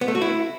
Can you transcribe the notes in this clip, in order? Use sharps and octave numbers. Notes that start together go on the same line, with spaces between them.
B3
A3
F#4
E4